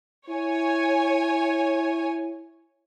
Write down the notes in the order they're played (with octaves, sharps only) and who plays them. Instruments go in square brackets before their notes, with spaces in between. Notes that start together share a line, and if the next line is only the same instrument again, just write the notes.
[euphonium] E4 [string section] C#5 G#5